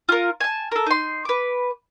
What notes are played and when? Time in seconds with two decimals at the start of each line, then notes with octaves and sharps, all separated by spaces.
0.09 F4 A#4
0.40 G#5 A5
0.72 A4 A#4
0.86 D#4 C6
1.25 B4 D6